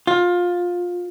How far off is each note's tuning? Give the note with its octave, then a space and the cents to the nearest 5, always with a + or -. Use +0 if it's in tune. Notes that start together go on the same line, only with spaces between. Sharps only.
F4 +20